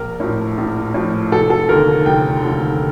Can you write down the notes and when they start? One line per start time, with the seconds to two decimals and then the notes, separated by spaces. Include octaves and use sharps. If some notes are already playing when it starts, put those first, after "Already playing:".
Already playing: A#1 A#4
0.20 A2 F3
0.57 A#1
0.94 A2 F3
1.31 F1 A4
1.50 A4
1.69 D#2 D3 F3 A#4
2.06 F1 G5
2.43 D#2 D3 F3